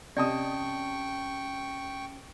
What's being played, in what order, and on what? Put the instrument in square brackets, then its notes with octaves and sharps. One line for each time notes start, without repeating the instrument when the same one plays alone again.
[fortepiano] C3 D#5 D#6 [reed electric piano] C#4 A5 [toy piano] D5 [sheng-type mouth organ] G5 C#6